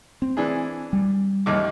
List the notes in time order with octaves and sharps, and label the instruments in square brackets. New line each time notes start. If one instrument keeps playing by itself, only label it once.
[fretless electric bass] C4
[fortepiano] E3 D4 G#4
[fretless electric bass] G3
[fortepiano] A1 D#2 D6